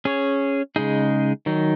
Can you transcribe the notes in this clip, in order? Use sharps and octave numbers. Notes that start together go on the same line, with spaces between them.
C#4 G#4 C#5
C#3 G#3 D#4 G#4
D#3 F#3 D#4